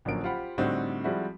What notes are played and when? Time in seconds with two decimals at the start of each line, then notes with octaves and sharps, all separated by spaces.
0.05 A1 D3 F3 F#3 A#3 D7
0.24 F4 G4 C5 F#5 B5
0.58 A2 D3 G3 C4 D#4 F#4
1.04 F3 G3 G#3 C4 E4 F#4